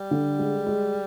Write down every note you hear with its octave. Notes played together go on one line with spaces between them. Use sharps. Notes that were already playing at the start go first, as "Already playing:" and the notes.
Already playing: G3
D3
G#3
G#3